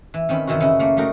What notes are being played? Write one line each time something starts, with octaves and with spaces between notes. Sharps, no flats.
E3
D#3 C4 C#4 B5
F#2 C3 D#3 E3 E4 F#4
C#3 C#4 E4 F#4
A3 A#3 F#5
G3 A3 D#4 F#4 A#4